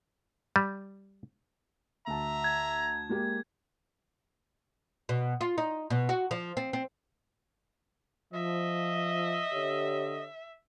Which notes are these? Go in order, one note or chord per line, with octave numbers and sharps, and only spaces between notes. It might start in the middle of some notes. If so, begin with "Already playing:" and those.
G3
D2 E5 A5 A#5
G#6
G#3 A#3 G4
B2
F4
D#4
B2
F#4
F3
C4
C4
F3 D#5 E5
D3 G4 C#5